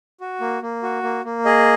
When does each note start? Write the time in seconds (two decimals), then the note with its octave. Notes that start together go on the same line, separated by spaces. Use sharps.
0.20 F#4
0.41 A#3
0.62 A#3
0.83 F#4
1.03 A#3
1.25 A#3
1.45 G#4 D#5